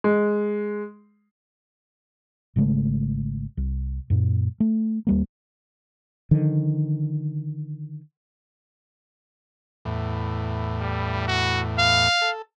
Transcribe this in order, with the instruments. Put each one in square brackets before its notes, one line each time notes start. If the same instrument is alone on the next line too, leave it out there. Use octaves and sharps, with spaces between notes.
[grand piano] G#3
[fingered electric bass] G#1 C#3 G#3 A3
C2
F#2 A#2
A3
D#2 G3 A#3
[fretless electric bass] D3 D#3 F3
[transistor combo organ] E2 A2
[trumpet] G3
F#4
F5
[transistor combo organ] A4